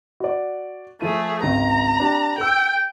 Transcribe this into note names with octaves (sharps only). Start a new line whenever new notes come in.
F#4 D5
F3 A3 F4 G#4 D#7
G#1 C#2 G#4 A#5
D4 G4
A4 G5 E6